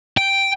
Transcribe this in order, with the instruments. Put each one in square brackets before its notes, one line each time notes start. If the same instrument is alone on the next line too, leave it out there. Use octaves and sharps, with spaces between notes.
[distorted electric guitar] G5